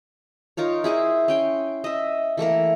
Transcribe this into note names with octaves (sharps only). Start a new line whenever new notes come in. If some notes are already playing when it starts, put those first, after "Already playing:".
D#4 F4 A#4 C#5
E4 G#4 C5 G#5
C#4 G5 C6
D#5 E5
E3 A3 A#3 A#4